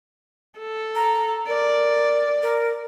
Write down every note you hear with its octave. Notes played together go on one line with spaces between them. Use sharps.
A4
A#5
A#4 D5
A#4